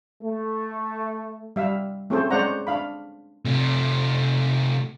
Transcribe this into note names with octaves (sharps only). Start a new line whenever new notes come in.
A3
G3 E5 F5
A3 C4 C#4 G#4 A4 C5
G#3 C#4 C5 D5 F#5 A#5
D4 F5 B5
C3 A3